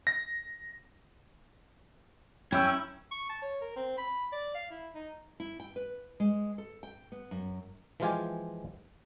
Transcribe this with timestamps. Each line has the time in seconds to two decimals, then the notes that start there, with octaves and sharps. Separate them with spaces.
0.07 A#6
2.52 F#2 C#4 E4 G5 E6
3.11 C#6
3.29 A5
3.42 C#5
3.61 A#4
3.76 C4
3.98 B5
4.32 D5
4.55 F5
4.71 E4
4.95 D#4
5.40 E4
5.60 G5
5.76 B4
6.20 G#3
6.58 A4
6.83 G5
7.12 B3
7.31 F#2
8.00 E3 F3 G#3 F4 G4 G#5